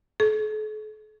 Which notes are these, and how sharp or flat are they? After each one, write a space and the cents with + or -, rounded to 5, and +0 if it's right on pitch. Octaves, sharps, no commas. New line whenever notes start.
A4 -45